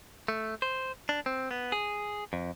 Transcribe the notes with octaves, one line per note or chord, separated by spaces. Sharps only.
A3
C5
D4
C4
B3
G#4
F2